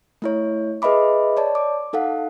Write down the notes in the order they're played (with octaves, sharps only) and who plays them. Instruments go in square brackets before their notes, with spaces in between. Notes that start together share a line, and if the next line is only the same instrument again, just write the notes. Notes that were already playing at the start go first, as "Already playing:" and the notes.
[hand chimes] A3 E4 C#5
G#4 B4 D#5 E5 B5 D6
C#5 D5 A5
D6
D#4 A4 F5 F#5